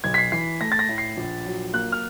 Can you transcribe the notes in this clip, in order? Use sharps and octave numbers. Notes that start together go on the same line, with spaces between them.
B1 G#6
B6
C7
E3 C7
A3 A#6
A6
A#6
A2
C7
A#1
F#3
A#3 F#6
F6